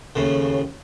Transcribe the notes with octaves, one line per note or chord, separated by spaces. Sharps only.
D#2 A2 C#3